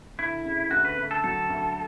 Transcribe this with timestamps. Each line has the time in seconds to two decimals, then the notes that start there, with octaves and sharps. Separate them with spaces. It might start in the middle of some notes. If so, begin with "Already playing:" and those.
0.18 D2 E4
0.45 C#3
0.71 D2 F#4
0.85 B4
0.98 D2
1.11 A4
1.24 F#3 A4
1.49 D2